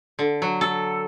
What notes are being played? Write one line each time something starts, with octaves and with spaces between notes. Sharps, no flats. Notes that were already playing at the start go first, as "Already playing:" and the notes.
D3
F#3
A4